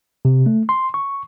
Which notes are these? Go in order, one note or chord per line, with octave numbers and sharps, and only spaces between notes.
C3
A3
C6
C#6